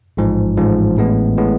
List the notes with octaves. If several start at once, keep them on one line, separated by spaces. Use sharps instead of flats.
A1 G#2 F3
A1 G#2 F3
A1 A2 G#3 B3
A2 G#3 B3